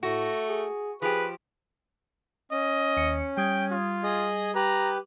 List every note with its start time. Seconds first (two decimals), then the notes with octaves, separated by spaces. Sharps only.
0.03 A2 A3 F#4
0.49 G#4
1.02 F3 G4 G#4 B4
2.51 C#4 D#5
2.97 D#2 C#7
3.37 G3 G5 D#6 G#6
3.71 F4
4.04 G#4 D#5
4.55 G4 B4 A#5